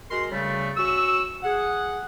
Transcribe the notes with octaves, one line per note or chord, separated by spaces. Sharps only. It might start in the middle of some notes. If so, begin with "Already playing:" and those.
G#3 F#4 A#4 C6
C#3 G3 A3
C#4 F#4 C#6 E6
G#4 F#5